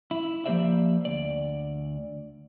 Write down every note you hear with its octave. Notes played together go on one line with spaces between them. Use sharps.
E4
F3 A#3 G4 C5 D5 E5
D2 D5